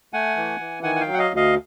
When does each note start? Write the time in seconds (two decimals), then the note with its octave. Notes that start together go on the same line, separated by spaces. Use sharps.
0.13 A3 F#5 G#5
0.36 E3
0.60 E3
0.83 D#3 F#5 G#5
0.96 F#5
1.00 F5 G5
1.07 F#3
1.14 F#5
1.19 D#5 F5
1.31 D2
1.36 D#5 F5